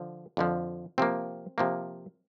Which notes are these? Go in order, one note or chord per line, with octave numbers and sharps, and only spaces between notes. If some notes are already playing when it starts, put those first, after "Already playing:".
Already playing: D3 F3
F2 D3 F3
C3 F3 A#3 C4
C3 F3 A#3